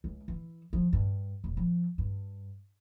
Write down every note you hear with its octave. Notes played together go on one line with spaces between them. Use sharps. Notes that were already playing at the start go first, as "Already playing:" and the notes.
C#2
E3
F3
G2
D#1
F3
G2